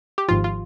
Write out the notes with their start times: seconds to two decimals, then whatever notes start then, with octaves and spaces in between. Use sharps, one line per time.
0.18 G4
0.28 G#1 G#2 F3 F4
0.44 F4